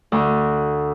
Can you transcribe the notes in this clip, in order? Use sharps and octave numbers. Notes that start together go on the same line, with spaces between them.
D2